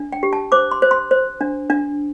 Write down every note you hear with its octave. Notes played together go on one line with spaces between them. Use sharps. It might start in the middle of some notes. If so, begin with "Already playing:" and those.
Already playing: D4
G5
G4
A5
C5 D6
C6
C5
C6
C5
D4
D4